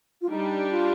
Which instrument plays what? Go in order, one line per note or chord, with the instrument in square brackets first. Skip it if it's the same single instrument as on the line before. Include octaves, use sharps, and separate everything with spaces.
[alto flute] F4
[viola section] G3 D4 G4 [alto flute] D#4
[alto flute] F4